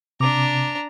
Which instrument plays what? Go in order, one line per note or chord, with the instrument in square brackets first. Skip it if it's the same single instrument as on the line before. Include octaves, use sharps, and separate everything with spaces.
[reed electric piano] C3 D6 [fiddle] D4 A#5